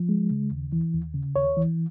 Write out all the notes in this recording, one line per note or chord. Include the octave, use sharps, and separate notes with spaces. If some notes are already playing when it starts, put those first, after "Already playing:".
Already playing: F3
G#3
C#3
D#2
E3
D#2
C#3
D#2 C#5
E3